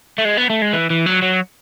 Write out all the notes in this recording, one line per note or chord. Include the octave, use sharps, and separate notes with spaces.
A3
G#3
B3
A3
G#3
E3
E3
F#3
F#3